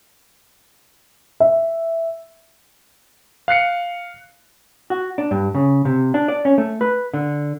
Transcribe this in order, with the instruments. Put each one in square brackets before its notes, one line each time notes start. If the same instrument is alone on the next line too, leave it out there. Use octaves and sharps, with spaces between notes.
[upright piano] E5
[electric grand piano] F5 F#6 C7 C#7
[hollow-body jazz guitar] F#4
D4
G2
C#3
C3
D4
D5
C#4
A3
B4
D3